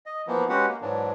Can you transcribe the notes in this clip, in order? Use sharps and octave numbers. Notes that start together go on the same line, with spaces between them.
D#5
E3 F3 A#3 B3
G#3 C#4 F#4 G4 B4 F#5
A#3
G#2 E3 F#3 D4